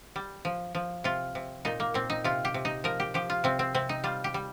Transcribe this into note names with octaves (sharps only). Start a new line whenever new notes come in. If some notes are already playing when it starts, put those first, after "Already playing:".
G3
F3
F3
C3 F4
C3
A#2 D#4
A#3
A#2 C4
D#4
C3 F4
G4
C3
D#4
F3 A#4
G4
F3 G4
F4
C3 C4
C4
C3 C4
D#4
G3 F4
G4
G3